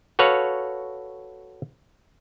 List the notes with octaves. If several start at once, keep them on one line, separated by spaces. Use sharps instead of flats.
F#4 A4 B4 C#5 F5